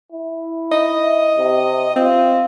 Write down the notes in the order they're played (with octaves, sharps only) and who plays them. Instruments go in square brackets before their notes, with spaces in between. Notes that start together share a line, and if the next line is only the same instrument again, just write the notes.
[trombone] E4
[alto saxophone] D#5
[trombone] C3
[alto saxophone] C4 [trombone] F4